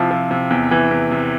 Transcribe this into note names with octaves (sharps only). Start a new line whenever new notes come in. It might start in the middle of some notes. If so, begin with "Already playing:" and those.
Already playing: C3 F3 E4
F3
C3
E2
E3
E2
C3